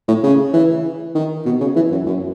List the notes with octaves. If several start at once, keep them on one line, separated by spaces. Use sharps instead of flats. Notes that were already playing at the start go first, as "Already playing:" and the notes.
A2
C#3
E3
D#3
B2
C#3
E3
F#2
F#2